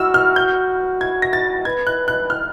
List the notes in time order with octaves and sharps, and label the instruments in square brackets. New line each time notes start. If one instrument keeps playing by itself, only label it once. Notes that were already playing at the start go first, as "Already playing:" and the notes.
Already playing: [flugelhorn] F#4 [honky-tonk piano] E6 F6
[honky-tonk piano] F6
G6
G#6
A#6
A6
[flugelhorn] B4 [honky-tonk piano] G#6
[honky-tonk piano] F#6
F#6
F6